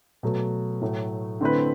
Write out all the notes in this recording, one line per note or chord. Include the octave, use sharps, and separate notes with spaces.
B2 F#3 A3
A2 F#3 A3
D3 A3 C4 E4 B4